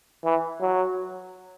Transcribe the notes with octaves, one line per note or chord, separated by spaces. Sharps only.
E3
F#3